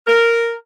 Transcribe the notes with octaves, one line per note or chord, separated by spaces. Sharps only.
A#4